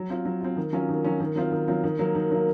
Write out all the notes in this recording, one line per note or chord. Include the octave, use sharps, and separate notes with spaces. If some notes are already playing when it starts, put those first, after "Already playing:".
Already playing: F#3
C4 F4
F#3
C4 F4
D#3
F#3 C#4 F4
D#3
F#3 C#4 F4
D#3
F#3 C4 F4
D#3
F#3 C4 F4
D#3
F#3 A#3
D#3
F#3 A#3